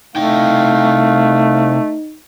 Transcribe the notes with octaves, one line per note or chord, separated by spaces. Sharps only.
C3 A3 D#4 E4 F5 G5